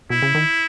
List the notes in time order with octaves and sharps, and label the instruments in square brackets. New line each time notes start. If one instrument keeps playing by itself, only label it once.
[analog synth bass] B2 [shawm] E4
[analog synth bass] C#3
D#3